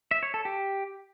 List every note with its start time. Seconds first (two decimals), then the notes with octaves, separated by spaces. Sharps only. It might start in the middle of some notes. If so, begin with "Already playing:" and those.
0.11 E5
0.23 C#5
0.34 A4
0.45 G4